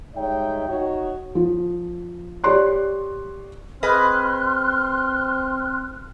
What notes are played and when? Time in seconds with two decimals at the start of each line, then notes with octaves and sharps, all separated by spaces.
0.16 G3 G#3 D#4 C#5 E5 G5
0.69 D#4 F#4 C#5
1.35 F3
2.44 G4 C#5 D5 C6 F#6
3.83 C4 G#4 B4 D#5 C6 F6 F#6